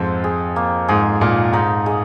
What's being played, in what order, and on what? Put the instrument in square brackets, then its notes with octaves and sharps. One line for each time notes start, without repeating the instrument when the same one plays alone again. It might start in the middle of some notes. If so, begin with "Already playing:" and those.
Already playing: [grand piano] F2 G#2 F3 G#3 [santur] C4 C5 F5
[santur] G#4
A#3
[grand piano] G#2 [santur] G#4
[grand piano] A#2 [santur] F5
[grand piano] G#2 [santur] D#4
[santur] G#3